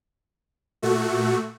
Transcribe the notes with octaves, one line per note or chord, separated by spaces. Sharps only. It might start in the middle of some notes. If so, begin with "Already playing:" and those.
A#2 A3 F#4